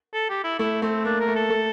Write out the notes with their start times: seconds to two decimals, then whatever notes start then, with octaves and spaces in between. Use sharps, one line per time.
0.14 A4
0.29 G4
0.44 E4
0.59 A3 E4
0.82 A3 C4
1.05 A#3 D4
1.20 A#4
1.28 A3
1.36 A4
1.50 A3